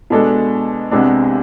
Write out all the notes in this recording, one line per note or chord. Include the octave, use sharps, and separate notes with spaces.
B2 G#3 D4 A4
C2 C3 G#3 B3 D4